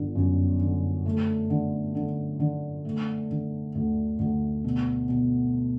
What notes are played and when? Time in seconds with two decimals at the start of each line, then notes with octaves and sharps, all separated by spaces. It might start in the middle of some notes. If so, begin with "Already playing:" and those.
Already playing: G1 D3
0.15 F#2
0.60 D3
1.06 A3
1.50 D3
1.95 D3
2.40 D3
2.85 A3
3.30 D3
3.75 D2
4.19 D2
4.64 B2
5.09 B2